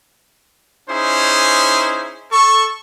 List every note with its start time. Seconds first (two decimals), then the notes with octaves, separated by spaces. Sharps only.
0.90 C#4 D#4 E4 G#4 C5
2.32 A4 C#6